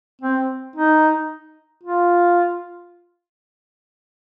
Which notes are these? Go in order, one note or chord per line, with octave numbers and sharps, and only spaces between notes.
C4
D#4
F4